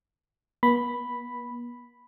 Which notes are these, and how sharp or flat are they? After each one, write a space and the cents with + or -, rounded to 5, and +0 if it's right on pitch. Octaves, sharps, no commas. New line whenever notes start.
B3 -45 B5 +0